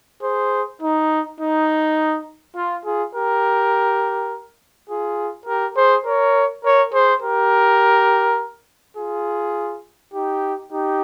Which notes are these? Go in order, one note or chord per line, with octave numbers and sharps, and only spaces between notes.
G#4 C5
D#4
D#4
F4
F4 G#4
G4 A#4
F4 G#4
G4 A#4
G#4 C5
A#4 C#5
A#4 C#5
G#4 C5
G4 A#4
F4 G#4
D#4 G4
D#4 G4